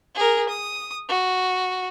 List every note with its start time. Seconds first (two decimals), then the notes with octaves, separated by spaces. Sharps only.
0.15 G#4 A#4
0.49 D#6
1.09 F#4